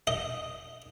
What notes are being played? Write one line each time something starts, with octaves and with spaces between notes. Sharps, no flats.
D#5